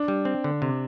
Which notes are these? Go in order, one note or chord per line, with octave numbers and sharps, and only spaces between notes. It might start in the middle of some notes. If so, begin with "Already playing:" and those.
Already playing: D4
G3
C4
D3
C3